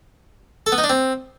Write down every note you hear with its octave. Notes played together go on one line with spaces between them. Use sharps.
A4
B3
D#4
D4
C4